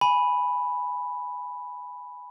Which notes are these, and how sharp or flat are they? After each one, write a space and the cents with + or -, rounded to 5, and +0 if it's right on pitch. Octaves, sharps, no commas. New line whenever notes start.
G#5 +0 B5 +0